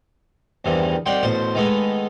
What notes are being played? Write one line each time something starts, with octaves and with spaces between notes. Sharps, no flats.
E2 G2 C3 D#3 E3
C2 D#4 D5 F#5 G5 C6
A1 B2 C5 A5 C6
D#3 G#3 A3 B3 D#4